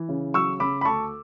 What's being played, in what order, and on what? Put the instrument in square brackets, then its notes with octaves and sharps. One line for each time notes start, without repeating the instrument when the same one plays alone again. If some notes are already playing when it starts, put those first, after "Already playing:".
Already playing: [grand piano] E3
C#3
F#3 C#6 E6
C#3 B5 D6
B5
D2 A5 C#6